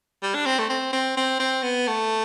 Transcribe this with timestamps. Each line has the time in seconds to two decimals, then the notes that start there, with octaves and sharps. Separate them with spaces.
0.23 G3
0.35 D4
0.46 C4
0.59 A3
0.70 C4
0.93 C4
1.17 C4
1.40 C4
1.63 B3
1.87 A3